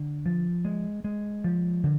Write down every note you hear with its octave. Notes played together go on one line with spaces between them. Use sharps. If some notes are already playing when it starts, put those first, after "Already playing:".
Already playing: D3
F3
G#3
G#3
F3
D3